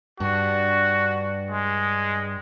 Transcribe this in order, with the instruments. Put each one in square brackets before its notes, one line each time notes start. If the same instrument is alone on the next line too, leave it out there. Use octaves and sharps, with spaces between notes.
[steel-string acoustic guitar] G2 D4 [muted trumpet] F#4
[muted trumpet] G#3